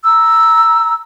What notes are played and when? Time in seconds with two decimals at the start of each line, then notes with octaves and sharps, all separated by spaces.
0.04 A#5 E6